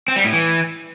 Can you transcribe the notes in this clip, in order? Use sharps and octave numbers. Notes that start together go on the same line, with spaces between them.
C4
G3
A2
E3